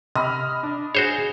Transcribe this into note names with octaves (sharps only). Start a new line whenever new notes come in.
C3 D#5 B5 F6
D4
F#4 G#4 C5 C#5